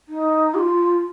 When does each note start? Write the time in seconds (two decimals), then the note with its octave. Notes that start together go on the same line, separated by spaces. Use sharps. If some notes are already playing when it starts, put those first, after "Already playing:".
0.09 D#4
0.55 G4
0.58 F4